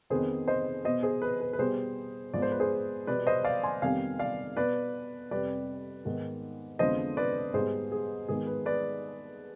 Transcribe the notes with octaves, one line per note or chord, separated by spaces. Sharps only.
F2 D#3 B3 G#4 C5
C5 D#5
B2 B3 C5 D#5
G#4 C5
B4
B4
B4
B2 G3 B3 G#4 C5
G#2 F3 G#3 B3 D5
C5
B4
G#4 C5
B2 G3 B3 B4 D5
C5 D#5
D5 F5
G#5 C6
F2 C3 D#3 G3 B3 F5 G#5
D5 F5
B2 B3 B4 D5
F2 C3 G3 B4 D5
G#2 D#3 B3
F2 D3 F3 G#3 B3 C5 D#5
B4 D5
G#2 G3 B3 G#4 C5
G#4
G#2 D#3 G#3 B3 G#4
B4
B4 D5